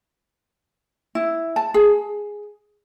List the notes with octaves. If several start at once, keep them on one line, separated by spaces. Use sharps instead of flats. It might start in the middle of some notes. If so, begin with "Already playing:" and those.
E4
A5
G#4